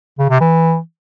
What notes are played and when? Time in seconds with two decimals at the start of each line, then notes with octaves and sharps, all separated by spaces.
0.19 C#3
0.30 C3
0.41 E3